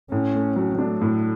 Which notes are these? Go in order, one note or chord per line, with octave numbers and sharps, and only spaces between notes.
A2 C#4
A3
F#3
A3 D4
A2